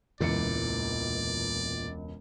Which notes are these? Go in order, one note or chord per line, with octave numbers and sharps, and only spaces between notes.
E1 C#2 A#2 E3 D5 C#7